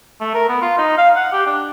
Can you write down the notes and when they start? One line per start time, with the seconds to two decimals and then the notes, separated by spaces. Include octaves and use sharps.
0.21 A3
0.35 A#4
0.49 B3
0.62 F4
0.78 D#4
0.98 F5
1.16 F#5
1.32 G4
1.47 D4